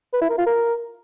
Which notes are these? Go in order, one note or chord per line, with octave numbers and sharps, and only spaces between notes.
B4
E4
A#4
F4
A#4